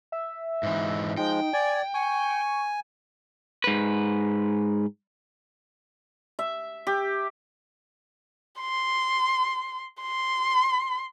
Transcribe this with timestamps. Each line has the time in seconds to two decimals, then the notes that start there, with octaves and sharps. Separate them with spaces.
0.12 E5
0.63 G#2 E3
1.18 F3 G#3 D#4 G5
1.53 D5 G#5
1.94 G#5 C#6
3.64 G#2 B4
6.39 E5
6.87 G4
8.60 C6
10.02 C6